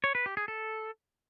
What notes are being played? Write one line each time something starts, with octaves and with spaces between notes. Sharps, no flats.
C#5
B4
G4
G#4
A4